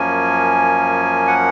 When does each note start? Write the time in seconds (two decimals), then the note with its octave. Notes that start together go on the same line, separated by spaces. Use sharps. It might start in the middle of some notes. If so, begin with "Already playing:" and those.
Already playing: F#2 F3 A#3 C#4 G#5
1.27 F#5